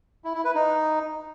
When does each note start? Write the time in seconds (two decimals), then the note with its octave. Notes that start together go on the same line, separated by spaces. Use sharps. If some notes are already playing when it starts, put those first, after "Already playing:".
0.24 E4
0.34 E4
0.45 B4
0.55 D#4